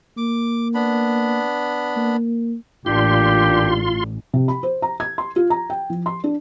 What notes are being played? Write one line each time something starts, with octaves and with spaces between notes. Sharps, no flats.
A#3 D6
B3 D4 B5
A#3
A1 A#2 D4 F4 G4 C6
C3
B5
C5
A#5
G#6
C6
F4
A#5
G5
F3
C6
D4